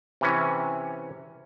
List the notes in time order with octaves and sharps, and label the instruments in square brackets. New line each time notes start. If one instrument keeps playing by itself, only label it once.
[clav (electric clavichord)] C3 E3 C#4